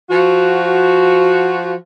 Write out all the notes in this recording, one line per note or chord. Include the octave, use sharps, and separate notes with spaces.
F3 F#4